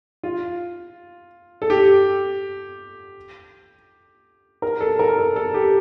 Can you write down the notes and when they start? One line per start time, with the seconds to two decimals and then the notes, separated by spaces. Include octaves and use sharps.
0.23 F4
1.62 A4
1.70 G4
4.62 A#4
4.81 A4
4.99 A#4
5.18 A4
5.36 A4
5.54 G4